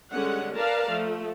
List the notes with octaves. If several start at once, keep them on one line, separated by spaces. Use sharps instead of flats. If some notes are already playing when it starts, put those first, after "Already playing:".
D3 G3 G#3 C#4 F#5
A#4 B4 D5 F5 A5 A#5
F3 A3